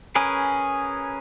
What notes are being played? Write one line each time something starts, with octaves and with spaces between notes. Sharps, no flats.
C#4 G#4 A#4 B4